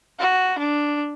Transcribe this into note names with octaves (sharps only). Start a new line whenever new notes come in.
F#4
D4